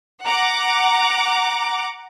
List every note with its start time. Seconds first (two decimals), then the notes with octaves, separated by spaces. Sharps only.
0.24 F#5 A#5 D6